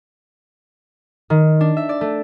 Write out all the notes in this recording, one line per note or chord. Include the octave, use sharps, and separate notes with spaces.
D#3
D4
E5
D5
A3